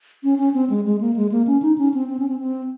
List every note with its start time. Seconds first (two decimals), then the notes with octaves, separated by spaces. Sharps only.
0.24 C#4
0.38 C#4
0.54 C4
0.70 G#3
0.86 G#3
1.01 A#3
1.16 G#3
1.32 A#3
1.47 C#4
1.62 D#4
1.78 C#4
1.94 C4
2.09 C4
2.19 C#4
2.28 C4
2.40 C4